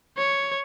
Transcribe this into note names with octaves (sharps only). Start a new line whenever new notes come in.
C#5